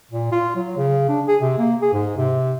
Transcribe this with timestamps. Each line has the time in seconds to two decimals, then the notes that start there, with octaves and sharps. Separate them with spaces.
0.11 A#2
0.32 F4
0.56 F#3
0.77 C#3
1.09 D4
1.27 G#4
1.41 C3
1.58 A#3
1.82 G#4
1.93 G#2
2.17 C3